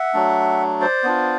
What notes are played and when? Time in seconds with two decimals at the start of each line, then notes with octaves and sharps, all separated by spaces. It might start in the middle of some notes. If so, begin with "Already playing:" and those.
Already playing: E5 F#5
0.14 F#3 A3 D4
0.81 C5 D5
1.04 B3 D4 F4